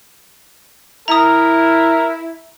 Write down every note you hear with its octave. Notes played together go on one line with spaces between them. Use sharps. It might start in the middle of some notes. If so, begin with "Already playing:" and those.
E4 A#4 A#5 D#6